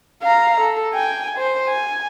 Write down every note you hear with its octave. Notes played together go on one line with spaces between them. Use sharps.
F5 A#5
A4
G5 G#5
C5
G#5